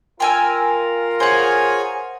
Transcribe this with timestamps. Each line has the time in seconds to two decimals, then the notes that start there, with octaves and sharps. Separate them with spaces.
0.20 F4 A#4 G5 G#5 E6
1.20 G#4 C5 C#5 F#5 G#5